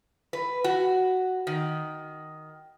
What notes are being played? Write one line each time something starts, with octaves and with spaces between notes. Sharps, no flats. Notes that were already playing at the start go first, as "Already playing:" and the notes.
B4
F#4
D#3